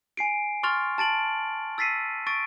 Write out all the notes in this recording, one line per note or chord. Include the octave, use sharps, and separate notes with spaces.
G#5 C7 D7
C6 C#6 F6 A6 F7
A5 A6 D7 F#7
E6 A6 B6 C7 D#7
C#6 A6 D7